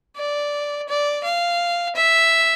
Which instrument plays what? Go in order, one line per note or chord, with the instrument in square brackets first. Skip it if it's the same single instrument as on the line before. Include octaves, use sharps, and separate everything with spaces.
[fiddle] D5
D5
F5
E5